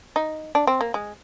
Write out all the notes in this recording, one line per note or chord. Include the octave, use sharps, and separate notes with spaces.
D#4
D4
C4
A#3
G#3